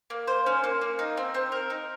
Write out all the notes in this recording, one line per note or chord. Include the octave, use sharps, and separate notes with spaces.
A#3
C5
C#4
A#3
A#3
D#4
C4
C4
A#4
D#4